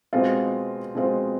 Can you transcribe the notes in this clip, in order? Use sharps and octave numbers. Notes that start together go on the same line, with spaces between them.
B2 G#3 C4 F4
B2 G#3 C4 F4